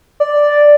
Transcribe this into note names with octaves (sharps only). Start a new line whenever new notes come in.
D5